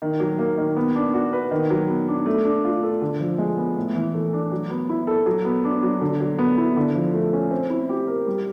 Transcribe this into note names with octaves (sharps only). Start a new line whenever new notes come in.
D#3
F#3
A#3
D#3
B3
D4
F#4
B4
D#3
F#3
B3
D4
A3
D4
F4
A4
D3
F3
G#3
B3
A2
E3
A3
D4
F#3
B3
E4
A4
F#3
B3
D4
F#3
D3
F#3
B3
E4
D3
F3
A3
C#4
C4
E4
G4
A#4
G3